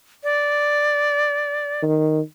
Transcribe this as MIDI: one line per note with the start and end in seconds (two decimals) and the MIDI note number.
0.24 1.82 74
1.83 2.21 51